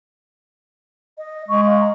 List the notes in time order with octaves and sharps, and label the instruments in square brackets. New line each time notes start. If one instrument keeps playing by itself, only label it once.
[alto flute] D#5
[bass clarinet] G#3 [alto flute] C#6
[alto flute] F5
A#5